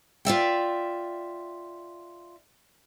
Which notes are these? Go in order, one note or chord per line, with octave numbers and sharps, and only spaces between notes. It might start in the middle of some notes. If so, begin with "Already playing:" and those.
F4 D5 E5 G5